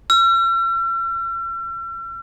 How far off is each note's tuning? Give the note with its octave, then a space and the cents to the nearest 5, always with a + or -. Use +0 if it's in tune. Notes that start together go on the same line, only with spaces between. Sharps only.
E6 +45